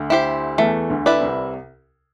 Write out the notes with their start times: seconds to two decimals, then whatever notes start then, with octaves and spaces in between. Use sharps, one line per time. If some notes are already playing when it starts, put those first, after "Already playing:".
Already playing: D2 D3
0.10 E4 G4 C5
0.58 E2 E3 A3
0.90 D2 D3
1.06 E4 B4 D5
1.21 C2 C3